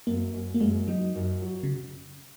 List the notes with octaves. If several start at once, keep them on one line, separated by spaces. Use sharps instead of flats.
F#2 A#3
F#2
A#3
F#2 G#3
F#3 D#4
F#2
F#3
C#3